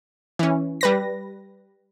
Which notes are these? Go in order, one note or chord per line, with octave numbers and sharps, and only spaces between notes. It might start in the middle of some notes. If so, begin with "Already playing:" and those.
E3 C#4
G3 B4 A#6